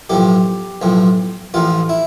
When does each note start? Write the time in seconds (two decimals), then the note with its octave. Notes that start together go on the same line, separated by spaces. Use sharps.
0.10 B1 A2 F3 G4
0.82 B1 A2 F3
1.54 A1 A2 F3 F4
1.89 E4